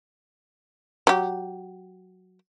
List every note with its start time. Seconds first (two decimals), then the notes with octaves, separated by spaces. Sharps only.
1.07 F#3 G4